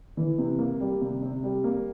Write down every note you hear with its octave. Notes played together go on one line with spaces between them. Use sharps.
E3
C3
A#3
G3
C3
C3
G3
A#3